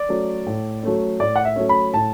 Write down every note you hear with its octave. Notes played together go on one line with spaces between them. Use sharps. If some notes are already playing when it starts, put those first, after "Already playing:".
Already playing: D5
F#3 A3 C#4
A2
F#3 A3 C#4
A2 D5
F#5
E5
F#3 A3 C#4
B5
A2 A5